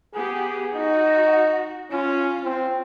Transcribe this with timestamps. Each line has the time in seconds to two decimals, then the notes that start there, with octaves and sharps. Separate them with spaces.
0.14 B3 G4 G#4
0.75 D#4 F#4
1.91 C#4 F4
2.44 C4